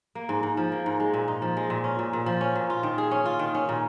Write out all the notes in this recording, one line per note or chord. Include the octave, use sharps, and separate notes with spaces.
A#3
G#2
G#2
F3
A#3
G#2
G#3
A#2
D#4
F3
G#3
A#2
C#4
A#2
A#2
F3
C#4
A#2
F4
D#3
G#4
C#4
F4
D#3
C#4
A#2